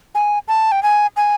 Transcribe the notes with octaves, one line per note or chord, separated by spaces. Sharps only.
G#5
A5
G5
G#5
G#5